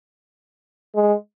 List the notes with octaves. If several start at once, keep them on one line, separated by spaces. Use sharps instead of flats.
G#3